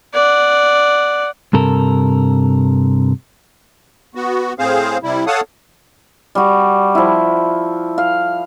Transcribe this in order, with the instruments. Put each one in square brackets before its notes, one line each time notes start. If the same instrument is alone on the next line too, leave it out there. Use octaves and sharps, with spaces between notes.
[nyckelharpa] D5 F#5
[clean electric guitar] G2 C3 A4 A#4
[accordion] B3 F#4
A2 C4 G#4 C5 F5
C3 G3 E4
A4 C#5 F5 F#5 A5 D#6
[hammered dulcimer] G3 F#4
F3 E4
F5